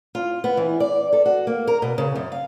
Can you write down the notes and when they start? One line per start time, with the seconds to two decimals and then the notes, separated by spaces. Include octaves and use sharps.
0.15 F4
0.44 B3
0.57 E3
0.80 D5
1.13 A4
1.26 F#4
1.47 A#3
1.67 A#4
1.82 B2
1.98 C#3
2.15 F#2
2.32 F5